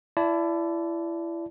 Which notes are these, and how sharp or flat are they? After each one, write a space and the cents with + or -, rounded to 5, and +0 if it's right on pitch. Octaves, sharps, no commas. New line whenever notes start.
E4 +25 D5 -10 A5 -10